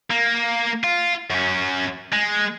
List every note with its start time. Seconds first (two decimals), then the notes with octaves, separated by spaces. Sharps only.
0.10 A#3
0.84 F4
1.30 F#2 C#4
2.13 G#3